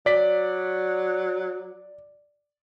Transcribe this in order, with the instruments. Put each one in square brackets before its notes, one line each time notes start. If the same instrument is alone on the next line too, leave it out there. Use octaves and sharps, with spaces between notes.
[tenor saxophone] F#3 [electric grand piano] D5 B6